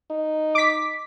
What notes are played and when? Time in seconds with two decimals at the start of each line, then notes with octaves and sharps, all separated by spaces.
0.11 D#4
0.55 D6 B6